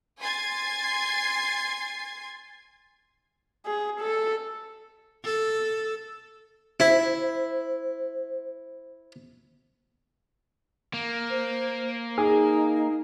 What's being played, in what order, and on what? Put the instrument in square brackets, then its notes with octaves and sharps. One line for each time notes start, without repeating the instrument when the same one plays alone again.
[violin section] G#5 C6 G#6 A6 C7
[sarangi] G#4
A4
[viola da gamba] A4
[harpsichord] E4 [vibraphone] C5
[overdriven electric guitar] A#3
[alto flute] C5
[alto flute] D#4 [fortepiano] G#4